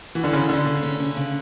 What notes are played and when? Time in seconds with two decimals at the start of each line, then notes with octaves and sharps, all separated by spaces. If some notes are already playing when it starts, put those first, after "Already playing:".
0.15 E3 F#4
0.24 D3
0.32 C#3 C#4
0.49 D3 C#4
0.66 C#3
0.83 C#4
1.00 C#4
1.16 C#3